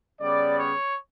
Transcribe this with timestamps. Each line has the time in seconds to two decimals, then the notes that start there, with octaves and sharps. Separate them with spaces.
0.21 C#3 G3 B3 D5
0.57 C#5